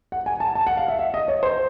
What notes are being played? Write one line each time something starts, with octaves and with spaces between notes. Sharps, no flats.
F#5
G#5
A5
A5
F#5
F5
E5
E5
D#5
C#5
C5